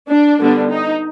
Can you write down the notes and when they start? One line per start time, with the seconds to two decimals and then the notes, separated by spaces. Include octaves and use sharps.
0.09 D4
0.40 D3 G3 B3 D4
0.71 D#4